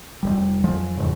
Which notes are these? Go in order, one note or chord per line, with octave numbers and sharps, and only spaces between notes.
F1 D#2 G3
F2 F3 F#3 G#3
F1 E2 G#2 C#3